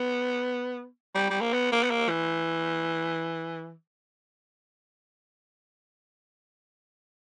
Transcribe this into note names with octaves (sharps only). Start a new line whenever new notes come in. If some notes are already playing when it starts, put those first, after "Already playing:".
Already playing: B3
G3
G3
A#3
B3
A#3
B3
A#3
E3